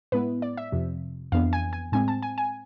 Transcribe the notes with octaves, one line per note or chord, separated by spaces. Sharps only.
A2 G#3 B3 E4 B4
D5
E5
F2 C3 F3
F2 E3 B3 D4 F5
G#5
G#5
A2 G#3 C4 G#5
A5
G#5
G#5